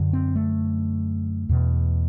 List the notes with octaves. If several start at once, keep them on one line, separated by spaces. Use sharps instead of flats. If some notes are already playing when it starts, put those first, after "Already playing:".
Already playing: F#2 D3
C4
A3
E2 B2